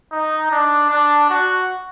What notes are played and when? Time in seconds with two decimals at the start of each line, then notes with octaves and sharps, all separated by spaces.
0.12 D#4
0.51 D4
0.90 D4
1.30 F#4